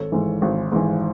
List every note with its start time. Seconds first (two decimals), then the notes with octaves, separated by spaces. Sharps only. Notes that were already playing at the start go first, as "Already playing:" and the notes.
Already playing: G#1 A4 C#5
0.12 G#2 E3
0.42 G#1
0.72 G#2 E3